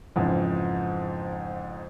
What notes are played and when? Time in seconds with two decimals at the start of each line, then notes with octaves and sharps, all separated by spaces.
0.16 F2 G#2 C#3 E3